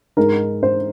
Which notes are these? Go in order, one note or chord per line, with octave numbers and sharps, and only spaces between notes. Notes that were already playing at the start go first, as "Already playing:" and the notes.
G#2 G#3 D#4 A#4
C5